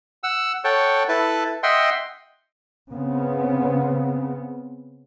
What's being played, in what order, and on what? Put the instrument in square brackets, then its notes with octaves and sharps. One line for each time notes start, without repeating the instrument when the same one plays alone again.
[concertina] F#5 E6
A4 C#5 F#5 G5
E4 A4 B4
D#5 E5 F#5 G5 C6
[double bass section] C#3 B3 C4